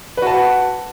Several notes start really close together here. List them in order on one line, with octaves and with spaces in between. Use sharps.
B4 F#4 A5